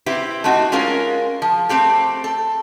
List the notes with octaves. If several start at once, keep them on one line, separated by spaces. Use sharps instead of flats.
C4 E4 G4 B4
A3 C4 D#4 F#4
G#3 C#4 F4 A#4
F3
A3 C4 G4 A4
A4